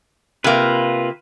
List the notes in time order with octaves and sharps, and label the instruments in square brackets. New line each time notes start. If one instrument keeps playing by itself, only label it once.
[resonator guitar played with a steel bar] C3 A#3 [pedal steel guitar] F4 B4